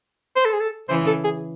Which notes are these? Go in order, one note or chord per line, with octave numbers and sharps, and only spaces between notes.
C5
A4
G#4
A4
C#3 E3 C5
A4
G#4